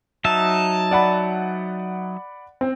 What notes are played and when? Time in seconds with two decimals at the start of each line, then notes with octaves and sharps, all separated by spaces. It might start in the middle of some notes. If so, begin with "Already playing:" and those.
0.25 F#3 D#4 E5 A5
0.91 D5 F#5 B5
2.61 C4